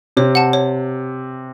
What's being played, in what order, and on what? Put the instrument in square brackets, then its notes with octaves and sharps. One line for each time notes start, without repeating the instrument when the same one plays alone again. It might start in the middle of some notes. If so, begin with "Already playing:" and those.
[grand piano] C3 [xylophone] C#5
[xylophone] F#5 A5
C#5